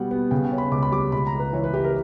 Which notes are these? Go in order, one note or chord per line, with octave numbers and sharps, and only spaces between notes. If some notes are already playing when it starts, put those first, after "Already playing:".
Already playing: B2 G3 B3 F#5 G5
B3
C#3 G5
G5
C#4
B5
C#2 D6
B5
G3 D6
C#2 B5
A#5
C#2
B4
E3 C#5
B4
E3 G4
A#4